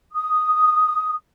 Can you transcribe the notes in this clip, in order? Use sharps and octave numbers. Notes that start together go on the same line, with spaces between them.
D#6